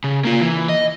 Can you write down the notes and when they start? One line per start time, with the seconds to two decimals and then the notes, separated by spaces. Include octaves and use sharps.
0.04 C#3
0.25 A#3 F4
0.41 E3
0.69 D#5